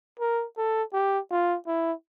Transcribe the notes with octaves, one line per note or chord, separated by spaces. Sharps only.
A#4
A4
G4
F4
E4